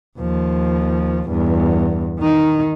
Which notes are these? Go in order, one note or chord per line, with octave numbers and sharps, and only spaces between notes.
D#2 F3
E2 G2
D#3 D#4